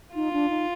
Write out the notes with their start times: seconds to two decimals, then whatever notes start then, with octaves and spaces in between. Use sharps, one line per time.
0.14 D#4 F4
0.33 D4
0.50 D#4